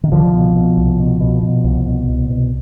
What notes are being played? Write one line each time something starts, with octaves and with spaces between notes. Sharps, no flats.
D#3
C2 D3 F3
B2
B2
C2
B2
B2
B2
C2
B2
C2
B2